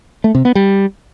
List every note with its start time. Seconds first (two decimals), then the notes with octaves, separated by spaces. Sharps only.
0.24 A3
0.35 C3
0.45 B3
0.55 G3